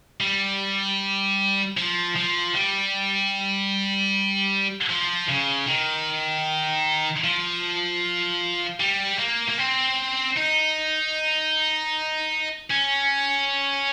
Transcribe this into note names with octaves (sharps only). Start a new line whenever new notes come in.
G3
F3
F3
G3
F3
C#3
D#3
F3
G3
A#3
A#3
C4
D#4
C#4